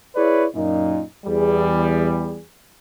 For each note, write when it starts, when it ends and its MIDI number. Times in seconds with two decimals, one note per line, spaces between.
0.16 0.45 64
0.16 0.45 68
0.16 0.45 71
0.16 0.45 73
0.16 0.45 74
0.54 1.02 42
0.54 1.02 46
0.54 1.02 63
1.26 2.40 40
1.26 2.40 55
1.26 2.40 68